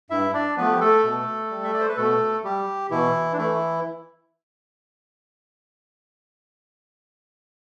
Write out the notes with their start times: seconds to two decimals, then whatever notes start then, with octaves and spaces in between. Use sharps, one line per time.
0.10 G2 E4 E5
0.33 D4 D5
0.57 F3 A3 B3 B4
0.72 G4
0.80 A3 A4
1.04 B2
1.51 G3
1.64 E5
1.73 D5
1.80 C5
1.89 B4
1.97 B2 A3 A4
2.44 G3 G4
2.90 B2 E3 E4
3.33 D4
3.37 E3 A3 E4